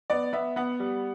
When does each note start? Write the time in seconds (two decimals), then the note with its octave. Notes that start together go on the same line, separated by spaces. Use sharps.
0.10 B3 D5
0.33 B3 E5
0.56 B3 F#5
0.80 G3